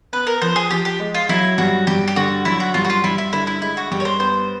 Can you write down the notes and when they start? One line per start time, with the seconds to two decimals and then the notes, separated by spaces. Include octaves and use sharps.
0.13 B3 B4
0.27 A#4
0.42 F3 C5
0.56 G#4
0.70 F3 G4
0.85 G4
1.00 G#3
1.14 F4
1.29 F#3 E4
1.58 G2 F#4
1.87 G2 G4
2.08 G4
2.16 D3 F#4
2.45 F#3 E4
2.60 F#4
2.74 G2 F4
2.85 F#4
2.90 F4
3.04 G2 E4
3.18 E4
3.33 D3 E4
3.47 E4
3.61 G#3 E4
3.77 F#4
3.91 G2 G4
4.00 C#5
4.05 C5
4.20 B3 C5